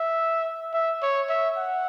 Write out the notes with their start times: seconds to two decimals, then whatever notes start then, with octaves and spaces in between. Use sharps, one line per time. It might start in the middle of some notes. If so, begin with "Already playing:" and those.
Already playing: E5
0.74 E5
1.02 C#5
1.29 E5
1.58 F#5